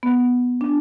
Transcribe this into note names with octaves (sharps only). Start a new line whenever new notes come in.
B3
D4